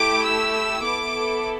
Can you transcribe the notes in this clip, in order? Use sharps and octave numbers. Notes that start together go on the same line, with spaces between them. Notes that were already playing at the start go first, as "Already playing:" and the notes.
Already playing: A3 E4 G4 D6
E6
B3 E4 A4 D6